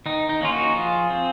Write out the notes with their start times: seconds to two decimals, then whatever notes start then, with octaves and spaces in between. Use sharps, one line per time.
0.06 D#3 D#4
0.29 D#4
0.41 A#3 C#4 F4
0.52 D#4 F#4
0.75 F3 F4 G#4
1.10 C4